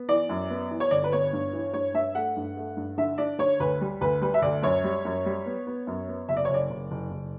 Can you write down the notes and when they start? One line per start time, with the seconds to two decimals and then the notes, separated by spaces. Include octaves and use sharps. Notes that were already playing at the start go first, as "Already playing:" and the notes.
Already playing: B3
0.08 E3 D5
0.29 F#2
0.50 B3
0.71 E3
0.80 C#5
0.91 G1 D5
1.04 B4
1.12 B3 C#5
1.33 G2
1.53 E3
1.74 G2 C#5
1.94 G2 E5
2.15 A3 F#5
2.36 G2
2.57 A3
2.77 G2
2.98 D3 E5
3.18 D4 D5
3.39 D3 C#5
3.60 D2 B4
3.81 G3
4.01 D2 B4
4.22 G3 B4
4.34 E5
4.42 D2 D5
4.62 F#2 C#5
4.84 G3
5.05 F#2
5.26 G3
5.46 B3
5.67 B3
5.87 F#2
6.08 B3
6.29 F#1 E5
6.37 D5
6.45 C#5
6.49 F#1
6.54 D5
6.70 F#1
6.91 F#1
7.10 F#1